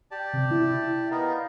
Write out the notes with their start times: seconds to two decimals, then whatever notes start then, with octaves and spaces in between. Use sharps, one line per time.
0.11 G4 D5 A5
0.33 C3
0.51 E4
1.11 B3 D#4 A#4 F5